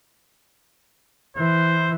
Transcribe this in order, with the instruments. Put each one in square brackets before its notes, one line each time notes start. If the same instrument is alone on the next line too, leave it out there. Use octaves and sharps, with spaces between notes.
[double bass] E3 [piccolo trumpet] C5